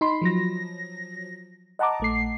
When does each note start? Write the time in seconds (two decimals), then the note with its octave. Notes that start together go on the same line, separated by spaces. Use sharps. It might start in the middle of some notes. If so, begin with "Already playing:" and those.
0.01 D#4 B5 C6
0.22 F3 F#3 A#6
1.79 D#5 F#5 A5 A#5 D6
2.00 A#1 A3 C7